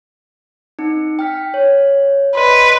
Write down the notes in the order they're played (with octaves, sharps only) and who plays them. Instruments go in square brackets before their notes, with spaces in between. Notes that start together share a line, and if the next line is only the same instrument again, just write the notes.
[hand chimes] C4 D#4
G5 F6 B6
C#5
[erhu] B4 [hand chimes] D5 D#5 C6